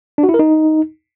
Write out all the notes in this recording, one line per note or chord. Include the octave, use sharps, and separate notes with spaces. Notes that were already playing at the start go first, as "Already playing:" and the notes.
D4
F#4
E4
A#4
D#4